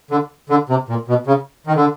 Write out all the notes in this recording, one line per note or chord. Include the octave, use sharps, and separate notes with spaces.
D3
D3
C3
A#2
B2
C#3
D#3
D3